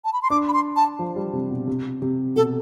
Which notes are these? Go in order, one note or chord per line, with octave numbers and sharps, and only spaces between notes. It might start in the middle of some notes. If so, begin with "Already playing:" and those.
A5
B5
C6
D4 D6
B5
C6
A5
F3
G3
C3
B2
C3
C3
B2 A4